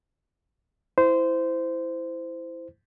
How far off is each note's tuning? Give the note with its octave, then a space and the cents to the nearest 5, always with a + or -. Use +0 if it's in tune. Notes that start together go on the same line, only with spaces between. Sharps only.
E4 +0 C5 -20